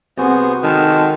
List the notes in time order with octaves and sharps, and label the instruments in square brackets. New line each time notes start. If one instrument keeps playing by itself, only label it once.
[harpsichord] C2 [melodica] B3 G#4 C5 [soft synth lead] F#4
[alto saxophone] D#3 [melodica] G#3 A4